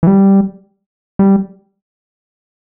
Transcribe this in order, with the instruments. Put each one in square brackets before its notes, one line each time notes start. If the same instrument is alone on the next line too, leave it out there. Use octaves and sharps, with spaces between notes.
[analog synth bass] E3
G3
G3